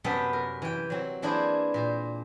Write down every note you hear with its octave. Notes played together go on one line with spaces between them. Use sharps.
F#2 C3 B3 B4 G5 A5
A#4
E3 G5
F#3 C4
E3 A#3 D4 E4 G#4 C5
A#2 C5